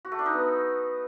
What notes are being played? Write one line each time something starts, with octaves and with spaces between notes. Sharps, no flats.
F#4
A3
D4
D#4
B3